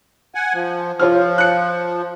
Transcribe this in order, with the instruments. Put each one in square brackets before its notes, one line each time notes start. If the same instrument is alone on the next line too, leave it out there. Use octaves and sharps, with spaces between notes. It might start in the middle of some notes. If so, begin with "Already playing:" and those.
[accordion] F#5 G#5
F3
[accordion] F3 [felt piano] F4 C#5 F6
[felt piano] F#6 C#7